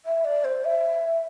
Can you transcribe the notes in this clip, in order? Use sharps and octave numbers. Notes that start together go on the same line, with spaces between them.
E5
D5
C5
E5